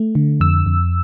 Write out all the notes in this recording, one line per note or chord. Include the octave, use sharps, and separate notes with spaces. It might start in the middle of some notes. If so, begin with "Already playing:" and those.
Already playing: A3
D3
F2 E6
F2